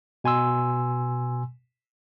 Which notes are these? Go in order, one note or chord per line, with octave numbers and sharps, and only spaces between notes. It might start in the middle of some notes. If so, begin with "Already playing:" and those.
B2 G#5 C6 E6